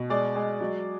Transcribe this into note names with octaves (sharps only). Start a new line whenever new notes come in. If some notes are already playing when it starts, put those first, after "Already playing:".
Already playing: B2
G#3 D5
G#3
F#3